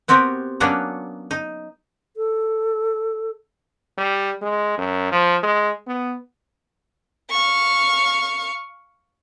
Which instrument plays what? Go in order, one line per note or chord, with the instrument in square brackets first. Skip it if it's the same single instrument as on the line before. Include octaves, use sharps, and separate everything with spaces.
[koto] B3 C4 F#4 G4 A#4
F#3 A#3 B3 C#4 D4 F#4
D#4
[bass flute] A4
[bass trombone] G3
G#3
F#2
F3
G#3
B3
[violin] F5 C#6